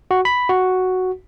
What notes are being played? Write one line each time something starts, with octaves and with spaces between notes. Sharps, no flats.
F#4
B5
F#4